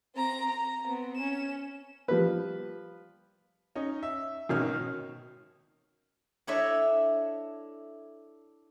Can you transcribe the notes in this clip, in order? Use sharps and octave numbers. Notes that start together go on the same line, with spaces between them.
C4 A#5
A#5
B3 C4
C#4 E7
F3 G3 B4
C#4 D#4
E5
G#1 B2 D#3 C#4 F6
D4 E4 A4 C#5 D#5 E5